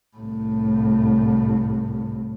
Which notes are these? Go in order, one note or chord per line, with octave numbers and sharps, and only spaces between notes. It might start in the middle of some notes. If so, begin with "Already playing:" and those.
C2 A2